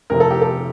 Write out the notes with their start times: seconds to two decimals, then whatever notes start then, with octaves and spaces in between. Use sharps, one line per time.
0.10 F1 F2 C3 A#4
0.20 A4
0.31 G4
0.42 A4